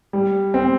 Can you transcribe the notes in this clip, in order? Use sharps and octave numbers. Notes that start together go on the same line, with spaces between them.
G3
C4